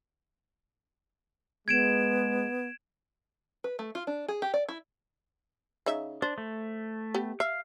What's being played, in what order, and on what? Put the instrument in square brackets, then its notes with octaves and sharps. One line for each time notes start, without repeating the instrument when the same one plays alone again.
[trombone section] G#3 [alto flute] B3 [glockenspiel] G#6 D7 E7
[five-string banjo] B4
A3
F4
D4
G#4
G4
D5
E4
[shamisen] C#3 D#4 E5
[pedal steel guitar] D4 [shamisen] C5
[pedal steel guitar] A3
[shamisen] B3 G4
[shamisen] E5 [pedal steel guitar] F5